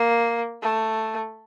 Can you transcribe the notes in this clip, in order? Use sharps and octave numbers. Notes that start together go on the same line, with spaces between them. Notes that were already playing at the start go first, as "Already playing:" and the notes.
Already playing: A#3
A3